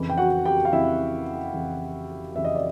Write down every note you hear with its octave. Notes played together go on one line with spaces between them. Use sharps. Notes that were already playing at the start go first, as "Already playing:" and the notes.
Already playing: F2 C#3 E3
G5
F#4 F#5
G4 G5
F5
F2 C#3 E3 E4 E5
F2 C#3 E3
F2 C#3 E3 E5
D#5
D5